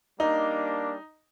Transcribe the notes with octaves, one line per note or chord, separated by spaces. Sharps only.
G3 A#3 D4 D#4